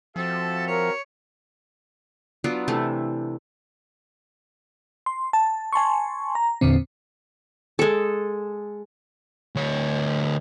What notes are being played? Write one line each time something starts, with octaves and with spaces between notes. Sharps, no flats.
F3 C4 F#4 A4 E5
A#4 C#5
F#3 B3 D4 F4
C3 E3 A3
C6
A5
G#5 A5 C6 C#6
A#5
E2 A#2 D3 C4
G#3 A4
D2 C#5